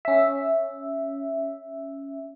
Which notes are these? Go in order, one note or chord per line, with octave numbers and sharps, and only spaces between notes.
C#4 E5